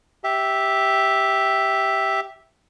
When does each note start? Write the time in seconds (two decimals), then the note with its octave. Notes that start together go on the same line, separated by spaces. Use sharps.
0.24 G4 E5